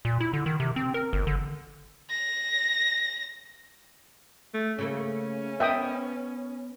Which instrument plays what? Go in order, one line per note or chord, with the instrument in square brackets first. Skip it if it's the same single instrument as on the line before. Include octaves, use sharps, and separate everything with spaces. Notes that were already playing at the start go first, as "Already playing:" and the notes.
[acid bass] A#2
E4
D3
D#3
C3
C4
A#4
G1
D3
[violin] A#6
[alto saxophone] A3
[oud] C#3 A3 A#3 [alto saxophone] C#4
[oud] B3 A#4 D#5 [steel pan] E5 G5 D#6